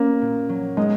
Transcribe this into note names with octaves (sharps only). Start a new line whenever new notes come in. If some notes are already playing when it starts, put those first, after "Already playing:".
Already playing: A#3 C#4
A#2
F#3
G#3 D#4